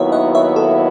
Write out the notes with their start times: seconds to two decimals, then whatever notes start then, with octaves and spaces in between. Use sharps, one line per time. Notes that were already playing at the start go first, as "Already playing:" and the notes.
Already playing: D#2 D#3 F#3 B3 E4 C#5 E5
0.12 D#5 F#5
0.35 C#5 E5
0.56 A4